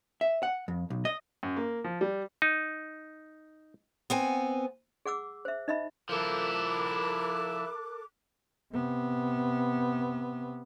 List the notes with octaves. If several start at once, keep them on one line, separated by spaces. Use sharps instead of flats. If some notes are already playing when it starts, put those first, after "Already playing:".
E5
F#5
F2
B1
D#5
F#2
A#3
F3
G3
D#4
B3 C4 G#5
G#4 F#5 D6 E6
C5 E5
D#4 D#5 E5 B5
F3 E4 A4 A#4 D6 F#6
C3 B3